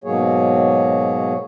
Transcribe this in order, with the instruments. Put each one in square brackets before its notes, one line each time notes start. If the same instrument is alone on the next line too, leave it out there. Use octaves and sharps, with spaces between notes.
[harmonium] G#2 B2 F#3 A#3 G#4 C#5